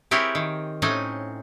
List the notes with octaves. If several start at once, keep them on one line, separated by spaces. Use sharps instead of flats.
C4 E4 G4 G#4 A#4 C#5
D#3
A2 C4 C#4 D#4 D#5 G#5